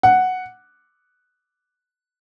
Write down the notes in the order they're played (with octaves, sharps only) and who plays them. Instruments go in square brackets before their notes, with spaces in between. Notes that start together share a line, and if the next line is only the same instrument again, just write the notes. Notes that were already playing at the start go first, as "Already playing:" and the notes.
[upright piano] F#5